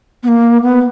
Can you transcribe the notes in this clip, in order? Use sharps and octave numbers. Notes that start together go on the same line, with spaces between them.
B3
A#3
B3